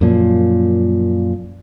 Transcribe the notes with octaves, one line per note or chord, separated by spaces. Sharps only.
F#2 A#2 F3